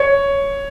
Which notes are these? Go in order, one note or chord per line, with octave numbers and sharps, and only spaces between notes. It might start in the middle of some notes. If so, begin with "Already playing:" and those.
Already playing: C#5